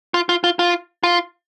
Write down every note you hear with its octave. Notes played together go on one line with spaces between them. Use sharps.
F4
F4
F4
F4
F4